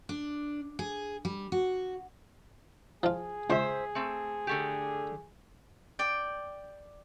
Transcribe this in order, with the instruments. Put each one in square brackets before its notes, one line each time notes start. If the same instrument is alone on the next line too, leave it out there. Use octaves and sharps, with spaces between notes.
[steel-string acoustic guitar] D4
G#4
G3
F#4
[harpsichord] F3 F4 [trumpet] G#4
[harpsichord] C#2 C#6 [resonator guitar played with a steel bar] C5 E5
[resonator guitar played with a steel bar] A3 C4
D3 A3 G4
[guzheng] D5 G5